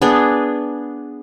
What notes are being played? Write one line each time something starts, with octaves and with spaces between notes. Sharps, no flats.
B3 D4 G#4